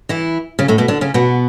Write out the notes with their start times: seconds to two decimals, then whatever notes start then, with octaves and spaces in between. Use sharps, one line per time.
0.09 E3 E4
0.59 C#3 C#4
0.68 A2 A3
0.78 B2 B3
0.88 D3 D4
1.01 C#3 C#4
1.14 B2 B3